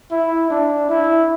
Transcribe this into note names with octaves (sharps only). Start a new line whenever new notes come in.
E4
D4
E4